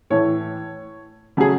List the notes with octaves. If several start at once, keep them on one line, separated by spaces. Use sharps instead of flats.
A2 E3 A3 C#5
C#3 F#3 A3 G#4